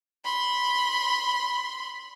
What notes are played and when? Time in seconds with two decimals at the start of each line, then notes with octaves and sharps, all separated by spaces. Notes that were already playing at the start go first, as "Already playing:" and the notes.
0.24 B5 C6